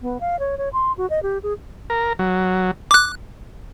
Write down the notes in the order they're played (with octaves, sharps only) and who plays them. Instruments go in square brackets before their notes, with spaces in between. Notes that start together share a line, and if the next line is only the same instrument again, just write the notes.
[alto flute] B3
F5
C#5
C#5
C6
F#4
D#5
G4
G#4
[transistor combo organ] A#4
F#3
[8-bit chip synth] D6 F#6